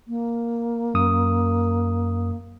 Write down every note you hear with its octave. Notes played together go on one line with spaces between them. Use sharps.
A#3
F#2 D#6